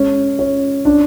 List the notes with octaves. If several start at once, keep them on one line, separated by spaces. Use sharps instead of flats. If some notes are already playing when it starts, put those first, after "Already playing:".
Already playing: G#3 C#4
C#4
D4